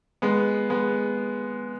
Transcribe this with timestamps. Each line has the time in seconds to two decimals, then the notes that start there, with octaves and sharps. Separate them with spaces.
0.22 G#3 B3
0.70 G#3 B3